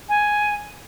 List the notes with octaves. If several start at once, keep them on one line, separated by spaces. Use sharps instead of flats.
G#5